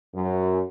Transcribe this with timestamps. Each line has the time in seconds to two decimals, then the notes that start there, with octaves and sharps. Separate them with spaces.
0.14 F#2